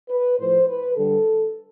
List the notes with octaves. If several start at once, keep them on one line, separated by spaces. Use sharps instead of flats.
B4
A2 F3 A3 C5
B4
D3 G3 A4